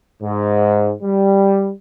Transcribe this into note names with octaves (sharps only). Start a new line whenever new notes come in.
G#2
G3